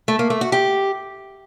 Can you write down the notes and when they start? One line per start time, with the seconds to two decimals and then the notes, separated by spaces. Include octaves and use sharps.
0.08 A3
0.19 A#3
0.30 A3
0.41 F#4
0.52 G4